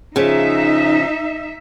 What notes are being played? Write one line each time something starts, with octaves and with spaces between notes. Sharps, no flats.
C#3 F3 D#4 E5